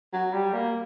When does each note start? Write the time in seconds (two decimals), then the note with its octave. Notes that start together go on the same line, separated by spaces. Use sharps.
0.13 F#3
0.33 G3
0.53 A#3